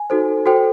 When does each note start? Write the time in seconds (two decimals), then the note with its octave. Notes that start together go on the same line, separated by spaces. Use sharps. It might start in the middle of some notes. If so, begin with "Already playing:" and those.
Already playing: G#5
0.10 D#4 F#4 A4 C5
0.46 F#4 A4 C5 G5